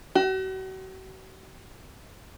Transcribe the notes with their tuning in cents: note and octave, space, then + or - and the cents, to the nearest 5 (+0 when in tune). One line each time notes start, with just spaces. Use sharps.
F#4 +40